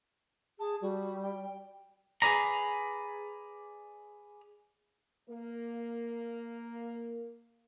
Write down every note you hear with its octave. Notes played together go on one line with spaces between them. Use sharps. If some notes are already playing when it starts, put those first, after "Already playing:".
G#4 A5
G3 F#4
G5
G#4 A4 B4 D5 A#5
A#3 A#4